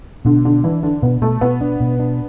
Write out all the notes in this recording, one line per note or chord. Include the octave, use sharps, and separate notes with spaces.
B2 D3
D3 D4
E3 D4
D3 D4
B2 B3
B2 A3
B2 B3
D4
B2
D4